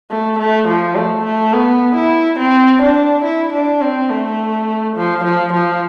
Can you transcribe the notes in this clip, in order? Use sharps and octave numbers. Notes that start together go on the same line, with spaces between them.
A3
A3
F3
A3
A3
B3
E4
C4
D4
E4
D4
C4
A3
F3
F3
F3